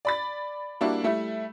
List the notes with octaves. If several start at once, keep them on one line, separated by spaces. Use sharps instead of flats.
D5 B5 A6
G3 A#3 D4 E4 F#4
G3 A3 E4